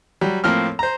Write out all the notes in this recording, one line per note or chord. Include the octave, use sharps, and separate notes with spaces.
F#3 G3
A2 F3 A#3 C4 F6
C5 A#5